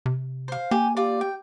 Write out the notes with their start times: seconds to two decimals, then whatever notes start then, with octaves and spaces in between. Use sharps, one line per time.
0.06 C3
0.48 C5 F5
0.71 A#3 G4 G#5
0.97 F4 G4 D5
1.21 G5